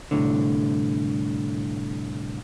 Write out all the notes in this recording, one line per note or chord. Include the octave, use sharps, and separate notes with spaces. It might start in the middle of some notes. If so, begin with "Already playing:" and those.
C2 F#2 A2 D3